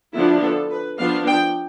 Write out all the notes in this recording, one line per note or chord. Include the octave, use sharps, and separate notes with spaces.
D3 F3 B3 D4 E4
A4
B4
F3 B3 D4 F5
G5